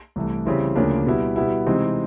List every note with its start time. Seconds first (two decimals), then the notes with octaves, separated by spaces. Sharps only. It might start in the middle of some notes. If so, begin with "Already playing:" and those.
0.16 C2 C3 E3 A3
0.45 C#3 E3 G3 C4 E4
0.76 D2 C#3 F3 A#3 D4
1.06 B2 G3 B3 E4
1.36 B2 G3 B3 E4
1.66 C3 E3 G#3 C4 D#4